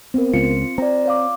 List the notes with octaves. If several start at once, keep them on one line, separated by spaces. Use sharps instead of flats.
B3 C4 A#4
C#2 F4 C#7
C4 D5 A#5
C#5 F5 D6